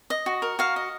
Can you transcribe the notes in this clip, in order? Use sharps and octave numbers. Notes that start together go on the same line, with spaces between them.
D#5
F#4
A#4
F#4 F5
D#5